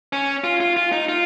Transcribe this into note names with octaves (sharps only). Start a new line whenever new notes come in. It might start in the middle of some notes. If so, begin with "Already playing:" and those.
C#4
F4
F4
F4
D#4
F4